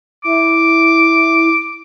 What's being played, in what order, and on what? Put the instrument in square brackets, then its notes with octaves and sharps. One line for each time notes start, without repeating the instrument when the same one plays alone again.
[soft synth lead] E4 [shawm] D6